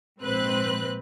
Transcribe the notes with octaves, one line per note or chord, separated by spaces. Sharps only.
A#1 G#2 C4 B4 F#6